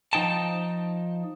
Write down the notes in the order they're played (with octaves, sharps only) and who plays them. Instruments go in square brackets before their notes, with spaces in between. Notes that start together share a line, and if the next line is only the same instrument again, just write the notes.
[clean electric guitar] F3 D#4 G5 A5